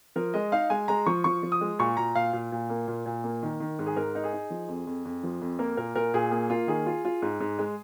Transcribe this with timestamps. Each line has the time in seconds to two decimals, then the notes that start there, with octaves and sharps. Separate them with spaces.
0.16 F3 A#4
0.34 G#3 D#5
0.52 D#4 F5
0.70 G#3 G#5
0.88 G#3 A#5
1.06 F3 C#6
1.24 F3 C#6
1.43 F3
1.52 D#6
1.61 G#3
1.79 A#2 C#6
1.97 A#2 A#5
2.15 A#2 F5
2.33 A#2
2.52 A#2
2.70 A#3
2.88 A#2
3.06 A#2
3.24 A#3
3.43 D#3
3.60 D#3
3.79 G#2
3.86 G#4
3.96 G#2 A#4
4.15 D#4
4.24 G#4
4.33 D#4
4.50 F3
4.68 F2
4.87 F2
5.05 F2
5.23 F3
5.41 F2
5.59 A#3 A#4
5.77 A#2 A#4
5.95 A#2 A#4
6.14 A#2 G#4
6.31 A#3 G#4
6.50 A#3 F4
6.67 D#3 G#4
6.86 F4
7.05 F4
7.22 G#2
7.40 G#2
7.59 G#3